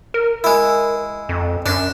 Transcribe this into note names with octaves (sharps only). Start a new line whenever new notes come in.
A#4
G#3 E4
F2
F#2 D4